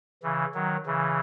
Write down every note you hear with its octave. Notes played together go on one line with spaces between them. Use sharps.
C#3 E3
D#3 F#3
C#3 E3